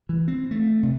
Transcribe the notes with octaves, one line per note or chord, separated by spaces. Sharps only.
E3
C4
A3
C3